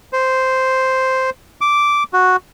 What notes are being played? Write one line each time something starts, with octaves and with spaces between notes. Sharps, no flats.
C5
D6
F#4